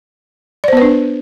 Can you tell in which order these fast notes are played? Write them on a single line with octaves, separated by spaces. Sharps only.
D5 C5 B3 B4 D4